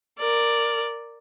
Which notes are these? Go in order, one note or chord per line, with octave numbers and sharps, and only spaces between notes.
A#4 D5